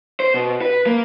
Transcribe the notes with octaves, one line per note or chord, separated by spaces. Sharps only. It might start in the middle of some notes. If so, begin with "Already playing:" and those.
C5
B2
B4
A#3